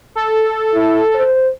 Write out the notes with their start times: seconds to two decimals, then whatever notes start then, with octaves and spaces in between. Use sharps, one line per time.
0.15 A4
0.74 E4
1.14 C5